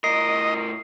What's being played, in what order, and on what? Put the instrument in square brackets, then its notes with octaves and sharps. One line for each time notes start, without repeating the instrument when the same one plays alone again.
[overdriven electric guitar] A2 A#4 [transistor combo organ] D#5 [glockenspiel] C7